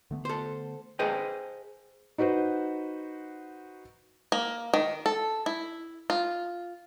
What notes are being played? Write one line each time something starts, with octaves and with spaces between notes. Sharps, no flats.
D3 A3 B3
A4 C5
G#4 B4 C5 D#5 G5
D#4 F#4 B4 C5
A#3
D#3
A4
E4
F4